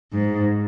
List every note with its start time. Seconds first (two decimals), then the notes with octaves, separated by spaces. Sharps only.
0.13 G#2